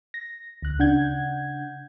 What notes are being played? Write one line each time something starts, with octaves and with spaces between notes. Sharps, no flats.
A#6
D2 F#6
C#3 D4 F#5 G6 G#6